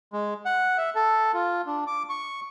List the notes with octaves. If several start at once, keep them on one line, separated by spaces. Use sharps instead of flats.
G#3
F#5
E5
A4
F4
D4
D6
C#6